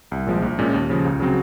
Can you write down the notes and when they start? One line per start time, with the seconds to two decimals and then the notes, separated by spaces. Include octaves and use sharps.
0.12 C2
0.27 A#2 F3 G#3
0.42 A#1
0.59 A#2 G#3 C#4
0.74 D#2
0.90 C#3 F3
1.05 C#2
1.20 C#3 F#3 C4